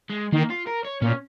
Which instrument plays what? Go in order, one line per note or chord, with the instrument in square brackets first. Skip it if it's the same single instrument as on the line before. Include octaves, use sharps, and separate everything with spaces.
[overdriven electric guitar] G#3
[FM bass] D#3 [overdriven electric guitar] A#3
[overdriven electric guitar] F4
A#4
C#5
[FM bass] A#2 [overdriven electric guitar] C#4